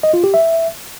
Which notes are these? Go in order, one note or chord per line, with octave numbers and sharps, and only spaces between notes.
D#5
F4
G4
E5